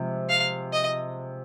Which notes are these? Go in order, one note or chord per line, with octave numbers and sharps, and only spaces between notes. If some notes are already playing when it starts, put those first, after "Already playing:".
Already playing: C3 F3 G#3
F5
D#5